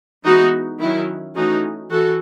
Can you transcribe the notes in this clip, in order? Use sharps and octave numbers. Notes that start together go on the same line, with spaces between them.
E3 G#3 B3 D#4 F#4
D#3 F#3 C#4 E4
E3 A3 C#4 D#4 F#4
E3 F#4 A4